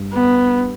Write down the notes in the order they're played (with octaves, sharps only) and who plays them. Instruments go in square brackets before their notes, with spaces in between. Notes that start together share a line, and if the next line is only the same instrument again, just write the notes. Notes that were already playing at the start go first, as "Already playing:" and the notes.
Already playing: [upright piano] G2
[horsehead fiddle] B3